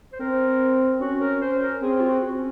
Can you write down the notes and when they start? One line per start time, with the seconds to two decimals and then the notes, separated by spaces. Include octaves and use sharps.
0.13 C5
0.20 C4 A#4
1.01 C#4 F#4
1.21 A#4
1.42 C5
1.62 A#4
1.82 C4 G#4
2.00 F4
2.09 F#4
2.36 C#4